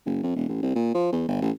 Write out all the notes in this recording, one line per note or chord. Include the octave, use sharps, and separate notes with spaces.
F#1
F2
E1
A1
C2
A#2
F3
E2
G1
A1